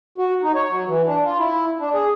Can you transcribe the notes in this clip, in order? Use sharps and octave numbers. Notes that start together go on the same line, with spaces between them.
F#4
D#4
C#5
F#3
E3
D4
F4
E4
D4
G#4